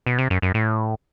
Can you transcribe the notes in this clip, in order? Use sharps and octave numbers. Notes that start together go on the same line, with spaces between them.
B2
C3
F#2
F#2
A2